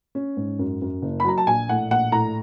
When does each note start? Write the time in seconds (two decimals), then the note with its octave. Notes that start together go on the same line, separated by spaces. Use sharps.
0.15 C#4
0.37 G#2
0.59 F#2
0.82 F#2
1.02 F#1
1.20 B5
1.25 F#3 A#5
1.38 A5
1.47 A#1 G#5
1.69 A2 F#5
1.90 A#1 F#5
2.12 A2 A#5